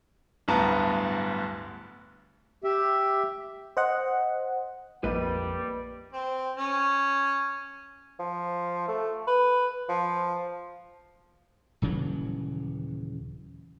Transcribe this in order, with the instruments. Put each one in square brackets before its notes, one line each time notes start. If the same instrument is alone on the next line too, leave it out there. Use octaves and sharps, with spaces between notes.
[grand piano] D1 D2 G2 B3 A5 A#5
[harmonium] G4 E5
[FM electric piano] C5 D#5 F#5
[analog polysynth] A#1 F2 [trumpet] G3 [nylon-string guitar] A#3 [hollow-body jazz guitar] B4 D#5
[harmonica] C4
C#4
[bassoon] F3
A3
B4
F3
[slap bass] D#1 C#3 E3 F#3